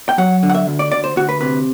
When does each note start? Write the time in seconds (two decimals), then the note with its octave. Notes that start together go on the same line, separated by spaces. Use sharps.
0.09 G5
0.18 F#3 F#5
0.43 D3
0.50 F#5
0.54 E5
0.67 D2
0.79 D5
0.92 D2 D5
1.04 C5
1.16 D2 F#4
1.29 B4
1.41 C3 B4